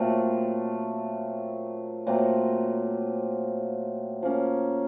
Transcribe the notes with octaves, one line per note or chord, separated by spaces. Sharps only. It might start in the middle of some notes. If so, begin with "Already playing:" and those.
Already playing: A#2 F#3 A3 C4
A#2 F#3 A3 C4
F3 A#3 C#4